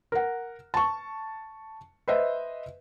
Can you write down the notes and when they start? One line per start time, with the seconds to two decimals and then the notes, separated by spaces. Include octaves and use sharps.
0.12 A#4 F#5
0.74 A5 C#6
2.08 B4 C5 D#5 E5